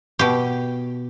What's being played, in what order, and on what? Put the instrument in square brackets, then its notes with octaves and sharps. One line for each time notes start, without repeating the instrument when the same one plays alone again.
[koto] B2 G4